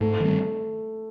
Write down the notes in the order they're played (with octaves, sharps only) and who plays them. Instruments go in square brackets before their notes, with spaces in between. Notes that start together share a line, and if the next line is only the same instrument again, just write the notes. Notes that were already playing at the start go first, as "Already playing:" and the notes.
[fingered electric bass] G#2 [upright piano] A3
[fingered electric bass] D#3 G3 C4